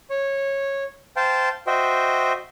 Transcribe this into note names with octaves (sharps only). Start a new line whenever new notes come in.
C#5
C5 F5 G5 A5
F#4 C5 D#5 E5 G5